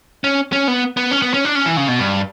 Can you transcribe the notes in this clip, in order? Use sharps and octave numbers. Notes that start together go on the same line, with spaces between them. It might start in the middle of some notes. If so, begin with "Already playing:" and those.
C#4
C#4
B3
B3
C#4
B3
C#4
D4
C#4
E3
C#3
B2
G2